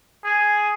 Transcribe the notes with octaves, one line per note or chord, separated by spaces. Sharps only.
G#4